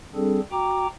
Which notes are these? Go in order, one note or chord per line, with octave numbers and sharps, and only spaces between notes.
G3 C4 D4 G#4 A4
F#4 G5 A#5 D6